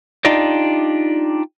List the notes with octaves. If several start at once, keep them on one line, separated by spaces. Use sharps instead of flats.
D4 D#4 F4 G4 D5 D#5